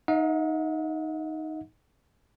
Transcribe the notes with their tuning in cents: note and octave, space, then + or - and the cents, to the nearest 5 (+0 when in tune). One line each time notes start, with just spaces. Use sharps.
D#4 +0 D#5 +45 F#5 -45